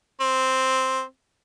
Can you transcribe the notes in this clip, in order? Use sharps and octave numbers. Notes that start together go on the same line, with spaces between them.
C4